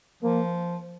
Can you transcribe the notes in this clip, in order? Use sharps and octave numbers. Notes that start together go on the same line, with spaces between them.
F3 A#3